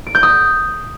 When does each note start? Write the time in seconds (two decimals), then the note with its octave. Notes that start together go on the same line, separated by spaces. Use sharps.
0.07 D7
0.15 G6
0.23 D#6